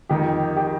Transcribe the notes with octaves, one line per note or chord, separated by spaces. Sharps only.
F2 D#3 G4
G4